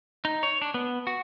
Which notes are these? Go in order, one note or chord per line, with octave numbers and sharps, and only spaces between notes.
D#4
C#5
D4
B3
F#4